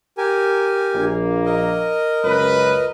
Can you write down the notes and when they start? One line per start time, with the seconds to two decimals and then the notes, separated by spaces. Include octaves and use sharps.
0.18 G4 A#4 G#5
0.95 A#1 A#3
1.46 A#4 D#5
2.24 C#2 F#2 B4